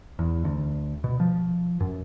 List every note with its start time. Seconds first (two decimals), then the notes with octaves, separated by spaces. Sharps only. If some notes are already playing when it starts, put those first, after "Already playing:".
0.19 E2
0.44 D2
1.04 B2
1.20 F3
1.80 F#2